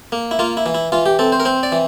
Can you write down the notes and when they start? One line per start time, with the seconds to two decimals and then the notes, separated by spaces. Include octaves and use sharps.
0.12 A#3
0.31 E4
0.39 A#3 F4
0.57 E4
0.66 E3
0.74 E4
0.92 E3 F4
1.06 G4
1.19 C4 A4
1.32 C5
1.40 A#4
1.45 C4 C5
1.63 D5
1.72 E3